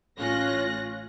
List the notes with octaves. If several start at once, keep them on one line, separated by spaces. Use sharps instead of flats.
A1 C#4 F4 F#6 A#6